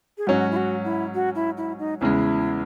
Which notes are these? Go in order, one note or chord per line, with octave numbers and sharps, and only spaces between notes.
G#4
G#2 F#3 C#4 F#4
E4
F#4
E4
F#4
E4
E4
D#4
E2 C#3 G#3 E4